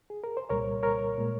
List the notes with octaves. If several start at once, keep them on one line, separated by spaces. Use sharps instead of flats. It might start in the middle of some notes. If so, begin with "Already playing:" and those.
G#4
A#4
C5
C2 A#2 G3 A#4 C#5
A#4 C#5
A#2 G#3